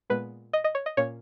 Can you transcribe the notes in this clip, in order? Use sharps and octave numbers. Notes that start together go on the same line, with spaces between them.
A#2 G#3 B3 B4
D#5
D#5
C#5
D#5
A#2 A#3 C#4 C#5